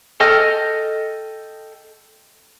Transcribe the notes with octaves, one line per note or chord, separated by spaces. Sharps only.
A4 D#5 G5 F6